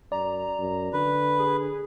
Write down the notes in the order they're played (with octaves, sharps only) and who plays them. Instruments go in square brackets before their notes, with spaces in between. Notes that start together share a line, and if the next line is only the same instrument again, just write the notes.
[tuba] F#2 [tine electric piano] D5 [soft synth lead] A#5
[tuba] F#2
[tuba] D3 [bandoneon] B4
[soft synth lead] G#4